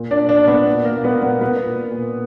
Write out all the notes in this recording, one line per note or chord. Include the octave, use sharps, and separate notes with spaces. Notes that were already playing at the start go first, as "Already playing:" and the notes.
Already playing: A#2
D4 D5
A#2
D4 D5
A#2
B3 B4
A#2
A#3 A#4
A#2
B3 B4
A#2
B3 B4
A#2 B3 B4
A#2
A#2